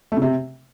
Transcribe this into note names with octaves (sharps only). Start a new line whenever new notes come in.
A3
C#3
C3